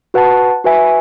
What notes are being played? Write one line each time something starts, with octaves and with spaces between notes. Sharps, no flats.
F#4 B4 F#5 A5
F#4 B4 E5 G#5